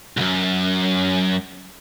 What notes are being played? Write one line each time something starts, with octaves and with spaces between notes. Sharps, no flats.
C2 F#2